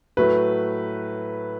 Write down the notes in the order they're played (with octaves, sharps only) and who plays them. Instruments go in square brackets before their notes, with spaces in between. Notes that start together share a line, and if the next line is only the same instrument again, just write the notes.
[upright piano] A2 F#3 A3 [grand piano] B4